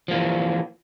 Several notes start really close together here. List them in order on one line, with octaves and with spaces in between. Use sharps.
F3 A#3 E3